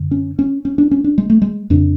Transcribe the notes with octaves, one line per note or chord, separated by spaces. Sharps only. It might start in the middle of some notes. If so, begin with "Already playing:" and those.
Already playing: F#2 D3
C#4
C#4
C#4
D4
C#4
D4
G#3
A3
G#3
F2 C#3 D4